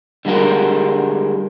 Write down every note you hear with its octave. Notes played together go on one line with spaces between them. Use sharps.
D3 G3 G#3 F#4 A#4